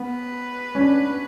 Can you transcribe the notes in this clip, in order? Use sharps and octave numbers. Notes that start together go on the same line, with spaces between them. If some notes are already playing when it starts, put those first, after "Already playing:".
Already playing: B3 B4
C#4
D4